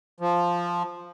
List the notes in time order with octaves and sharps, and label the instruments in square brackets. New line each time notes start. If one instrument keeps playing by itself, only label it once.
[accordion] F3